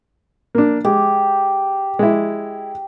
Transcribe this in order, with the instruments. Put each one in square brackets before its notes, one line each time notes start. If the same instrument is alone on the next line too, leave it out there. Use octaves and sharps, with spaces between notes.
[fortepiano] A#3 D4
[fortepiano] G#3 [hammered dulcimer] G4
[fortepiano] G#3 E4